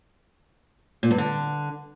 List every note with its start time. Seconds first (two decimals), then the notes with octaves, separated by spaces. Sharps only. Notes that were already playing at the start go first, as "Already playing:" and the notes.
1.03 A#2
1.11 G2
1.18 D3